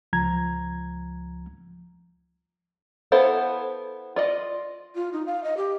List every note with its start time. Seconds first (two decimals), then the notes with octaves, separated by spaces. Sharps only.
0.13 C#2 F3 A#5 G#6
3.12 B3 E4 A4 C5 F5
4.16 F4 D5 D#5
4.95 F4
5.13 D#4
5.26 F5
5.44 D#5
5.57 G4